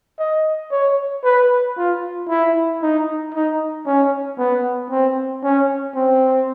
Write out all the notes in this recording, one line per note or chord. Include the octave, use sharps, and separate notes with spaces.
D#5
C#5
B4
F4
E4
D#4
D#4
C#4
B3
C4
C#4
C4